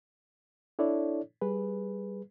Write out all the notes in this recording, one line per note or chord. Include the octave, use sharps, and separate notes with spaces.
D4 E4 A4 C#5 D5
G3 G#4 B4